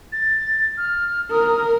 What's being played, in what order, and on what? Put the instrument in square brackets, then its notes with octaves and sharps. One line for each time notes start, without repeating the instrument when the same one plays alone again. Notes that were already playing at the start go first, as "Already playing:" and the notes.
[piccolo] A6
F6
[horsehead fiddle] A#4 [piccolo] D#6